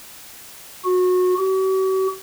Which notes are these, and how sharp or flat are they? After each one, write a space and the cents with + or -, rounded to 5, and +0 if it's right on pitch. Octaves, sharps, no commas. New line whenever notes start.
F#4 -25
F#4 +45